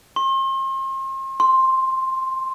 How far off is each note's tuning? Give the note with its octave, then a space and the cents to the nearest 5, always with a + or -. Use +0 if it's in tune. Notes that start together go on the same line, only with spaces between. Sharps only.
C6 +40
C6 +5